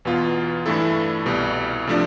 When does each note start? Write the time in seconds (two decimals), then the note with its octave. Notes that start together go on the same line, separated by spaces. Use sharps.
0.05 E2 B2 B3 F4
0.66 G2 E3 A3 E4 A4
1.26 C2 B2 G3
1.87 C3 F3 A3 D4